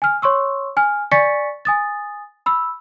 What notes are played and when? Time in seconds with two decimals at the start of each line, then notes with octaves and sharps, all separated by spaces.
0.02 G#5 F6
0.22 C#5 C6 C#6 E6
0.77 G#5 F6
1.12 D5 G#5 C#6 A6 B6 C#7
1.65 G#5 D#6 A6
2.46 B5 E6